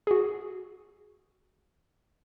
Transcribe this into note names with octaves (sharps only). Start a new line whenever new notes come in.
F#4 G#4